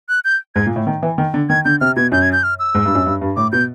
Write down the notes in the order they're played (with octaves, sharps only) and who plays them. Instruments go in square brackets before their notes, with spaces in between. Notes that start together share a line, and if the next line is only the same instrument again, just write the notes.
[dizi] F#6
G6
[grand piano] G#2 [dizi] G#6
[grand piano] A#2
A2
D#3
E3
D#3
D3
[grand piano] D#3 [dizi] G#6
[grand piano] D3 [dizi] G6
[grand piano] C3 [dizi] F6
[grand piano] B2 [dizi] G#6
[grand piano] F#2 [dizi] G6
[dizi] G#6
G6
F6
E6
[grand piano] G#2
G2
F#2
G2
G2
[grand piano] A2 [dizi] D6
[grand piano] B2 [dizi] G6